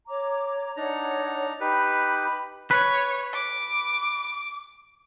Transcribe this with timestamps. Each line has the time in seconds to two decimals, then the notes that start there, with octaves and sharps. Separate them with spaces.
0.08 C#5 A#5 D6
0.77 D4 D#4 C#5 F#5 A#5
1.61 D#4 G4 B4 B5
2.71 B4 C#5
3.33 D6